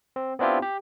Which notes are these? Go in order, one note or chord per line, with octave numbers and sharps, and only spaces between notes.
C4
B3 C4 D4 E4 F4 G4
G4